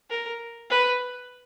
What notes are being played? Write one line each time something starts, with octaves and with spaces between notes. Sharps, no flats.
A#4
B4